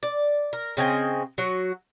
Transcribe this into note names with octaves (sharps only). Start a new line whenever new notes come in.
D5
A#4
C#3 C4 D#5 G#5
F#3 F#4